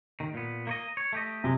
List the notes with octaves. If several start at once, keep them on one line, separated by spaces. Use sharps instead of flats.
D#2 D#3
A#2 B3
A#3 C#5 D#5
C#5
A3 G4 D#5
F2 C3 G#3